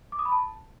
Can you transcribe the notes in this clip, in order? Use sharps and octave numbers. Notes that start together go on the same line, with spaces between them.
D6
D#6
B5
A5